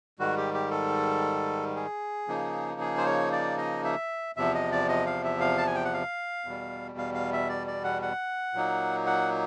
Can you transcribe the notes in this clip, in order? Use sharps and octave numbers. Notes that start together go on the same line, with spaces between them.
G#2 D#3 G3 F#4
G4
G4
A4
G#4
C#3 F3 A#3 D#4
G#4
C5
C#5
D5
D#5
E5
E2 C3 F3 E5
D#5
D5
D#5
F5
E5
F5
A5
G#5
G5
F#5
F5
E2 B2 G3
F5
F5
E5
D5
D5
F#5
F#5
A#2 F#3 A#3 D#4
F#5